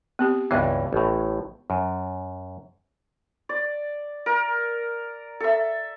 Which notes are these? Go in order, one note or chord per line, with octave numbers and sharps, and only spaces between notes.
B3 C4 G4
C#2 G2 E3 B3 C#5 E5
A1 A2
F#2
D5
A#4
A4 E5